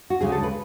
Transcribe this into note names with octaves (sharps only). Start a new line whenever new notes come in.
F#4
D2 C#3 G#3 D4 G#4
A4
B4